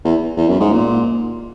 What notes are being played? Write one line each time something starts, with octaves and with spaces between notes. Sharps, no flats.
E2
E2
F#2
G#2
A#2